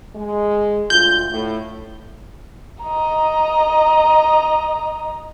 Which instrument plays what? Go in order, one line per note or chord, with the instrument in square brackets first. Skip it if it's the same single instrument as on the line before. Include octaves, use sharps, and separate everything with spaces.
[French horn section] G#3
[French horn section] D2 F4 [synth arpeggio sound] G6
[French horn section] A2
[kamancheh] D#5 A#5